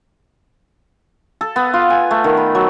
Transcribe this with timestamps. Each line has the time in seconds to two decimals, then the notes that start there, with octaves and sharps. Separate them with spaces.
1.41 A4
1.56 B3
1.74 F4
1.90 G#5
2.11 A3
2.24 D#3
2.37 B5
2.55 F#3